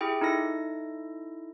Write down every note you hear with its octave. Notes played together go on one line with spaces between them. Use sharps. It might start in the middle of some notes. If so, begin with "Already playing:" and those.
E4 G4 G#4 G5
D#4 E4 A4 A#6